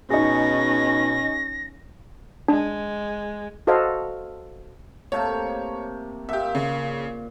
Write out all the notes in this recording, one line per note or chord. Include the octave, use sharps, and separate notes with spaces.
B2 C#4 D#4 G#4 A#6
G#3 D4
F#4 A4 C5 D#5 F5
C3 A3 A#3 C#5
A#2 G4 E5
C#3